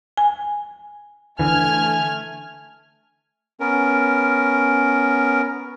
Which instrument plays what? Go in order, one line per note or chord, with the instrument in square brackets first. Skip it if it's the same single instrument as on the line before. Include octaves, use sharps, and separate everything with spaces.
[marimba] G#5
[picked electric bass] D3 E3 [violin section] A3 F6 G#6 [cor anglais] G#5
[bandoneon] B3 C#4 A#4